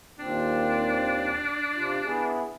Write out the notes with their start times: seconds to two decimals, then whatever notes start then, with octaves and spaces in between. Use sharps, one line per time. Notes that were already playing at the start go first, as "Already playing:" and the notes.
0.19 D#2 A#2 C4 D4
1.75 C3 F4
2.05 B3 E4 G#4